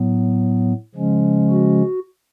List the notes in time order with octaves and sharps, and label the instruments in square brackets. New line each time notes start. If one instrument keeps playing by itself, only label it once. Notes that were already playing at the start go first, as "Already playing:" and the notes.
Already playing: [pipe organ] A2 F#3 B3
C#3 F3 G#3 C#4
F#4